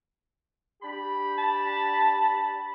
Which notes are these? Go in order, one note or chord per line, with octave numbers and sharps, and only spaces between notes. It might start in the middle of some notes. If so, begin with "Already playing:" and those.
D4 G4 B5
A5